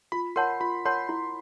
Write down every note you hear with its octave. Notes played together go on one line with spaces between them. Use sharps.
F4 B5
A#4 C#5 F#5 A5 C6
F4 B5
A#4 C#5 F#5 A5 C6
E4